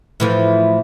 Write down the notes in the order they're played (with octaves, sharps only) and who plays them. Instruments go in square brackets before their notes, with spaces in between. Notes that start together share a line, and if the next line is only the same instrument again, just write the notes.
[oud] A2 E3 F3